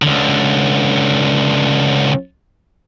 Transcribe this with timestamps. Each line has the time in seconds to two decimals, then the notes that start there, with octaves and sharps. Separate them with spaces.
0.02 C#2 D3